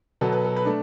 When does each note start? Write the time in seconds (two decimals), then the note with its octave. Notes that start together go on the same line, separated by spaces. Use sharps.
0.21 B2 F#3 B3 A4
0.32 B4
0.44 A4
0.56 B4
0.65 A3 D4